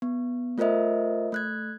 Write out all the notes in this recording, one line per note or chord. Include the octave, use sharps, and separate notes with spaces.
B3
A3 F4 A#4 C5 D#5 E5
A3 F#6 G#6